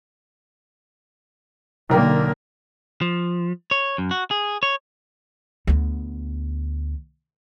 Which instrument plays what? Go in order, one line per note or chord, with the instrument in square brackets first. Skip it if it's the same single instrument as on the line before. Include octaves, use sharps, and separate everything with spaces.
[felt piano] B1 A#4 G5 [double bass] D3 A#3
[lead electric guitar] F3
C#5
F#2
F#4
G#4
C#5
[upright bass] D2 B3